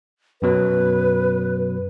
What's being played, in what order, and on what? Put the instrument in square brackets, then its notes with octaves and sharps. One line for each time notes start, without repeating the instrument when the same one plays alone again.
[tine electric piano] F#2 B2 F#3 [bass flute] B4